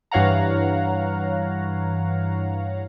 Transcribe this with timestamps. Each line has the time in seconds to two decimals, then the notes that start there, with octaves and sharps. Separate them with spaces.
0.12 G2 E3 C#5 F5 F#5 A#5